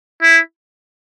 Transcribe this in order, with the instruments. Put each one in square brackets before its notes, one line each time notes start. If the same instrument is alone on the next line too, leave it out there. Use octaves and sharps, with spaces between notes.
[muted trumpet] E4